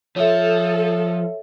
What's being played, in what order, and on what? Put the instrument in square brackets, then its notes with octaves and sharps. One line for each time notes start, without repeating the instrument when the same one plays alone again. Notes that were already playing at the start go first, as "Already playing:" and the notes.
[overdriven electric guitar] F3 [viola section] A4 [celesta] C#5 E5